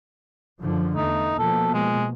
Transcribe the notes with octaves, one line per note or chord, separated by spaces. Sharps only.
F#2 D3 F3
E2 A3 D#4
B2 F3 A#3 A4
G#3